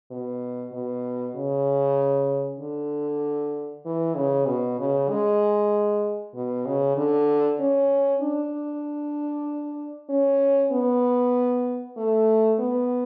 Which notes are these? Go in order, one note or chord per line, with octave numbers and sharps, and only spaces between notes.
B2
B2
C#3
D3
E3
C#3
B2
C#3
G#3
B2
C#3
D3
C#4
D4
C#4
B3
A3
B3